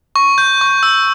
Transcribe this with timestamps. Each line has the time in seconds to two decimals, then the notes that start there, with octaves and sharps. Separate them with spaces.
0.16 C#6
0.38 G6
0.61 C#6
0.83 E6